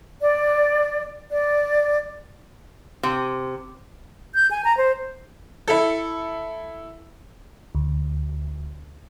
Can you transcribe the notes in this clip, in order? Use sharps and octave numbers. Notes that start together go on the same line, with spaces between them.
D5
D5
C3
G6
G#5
A#5
C5
E4 A4
D2